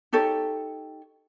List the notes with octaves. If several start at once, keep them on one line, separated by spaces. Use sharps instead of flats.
D#4 G4 A4 C#5